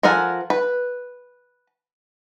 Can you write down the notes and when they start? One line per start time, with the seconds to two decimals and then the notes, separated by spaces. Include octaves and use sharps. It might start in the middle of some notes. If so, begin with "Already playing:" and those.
0.03 F3 A4 A#4 F#5 G#5
0.50 B4